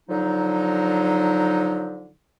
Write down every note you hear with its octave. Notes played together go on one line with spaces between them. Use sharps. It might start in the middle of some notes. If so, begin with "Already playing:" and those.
D3 F3 F#3 D#4